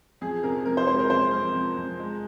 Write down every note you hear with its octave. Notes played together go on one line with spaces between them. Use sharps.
F2 G#4
C3 A#4
F2 A#4
C5
G#3 C5
A#4
F2 C5
F2 A#4
F2
F2
G#3